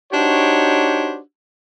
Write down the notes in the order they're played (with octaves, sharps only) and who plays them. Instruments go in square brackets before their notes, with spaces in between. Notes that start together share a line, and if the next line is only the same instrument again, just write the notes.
[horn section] D4 D#4 F#4 G4 C5 C#5